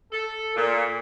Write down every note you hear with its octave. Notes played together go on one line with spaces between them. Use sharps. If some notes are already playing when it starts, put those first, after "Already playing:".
A4
A#2